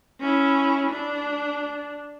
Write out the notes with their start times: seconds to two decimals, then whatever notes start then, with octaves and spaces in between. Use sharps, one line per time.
0.20 C#4 E4
0.90 D4